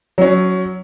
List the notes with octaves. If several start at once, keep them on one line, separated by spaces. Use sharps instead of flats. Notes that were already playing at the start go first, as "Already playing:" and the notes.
F#3 C#4